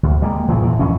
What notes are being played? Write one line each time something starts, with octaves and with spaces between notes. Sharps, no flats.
D2
G3 G#3 A#3
E2 A#2 C#3 F3
A#2 E3
F2 E3 C#4